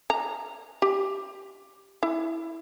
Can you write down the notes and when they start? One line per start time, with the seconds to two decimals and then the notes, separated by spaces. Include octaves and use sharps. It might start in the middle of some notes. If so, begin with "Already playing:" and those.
0.10 A#5
0.82 G4
2.03 E4